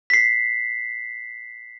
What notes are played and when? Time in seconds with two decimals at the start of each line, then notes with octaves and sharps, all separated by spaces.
0.10 B6 C7